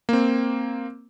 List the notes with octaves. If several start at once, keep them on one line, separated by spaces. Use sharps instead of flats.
A#3 C4